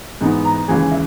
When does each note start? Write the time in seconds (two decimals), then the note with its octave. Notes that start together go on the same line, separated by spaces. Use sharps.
0.21 G#2 E3 B3 D#4
0.45 A#5
0.68 D#2 C#3 E3 G#3 G#5
0.91 E5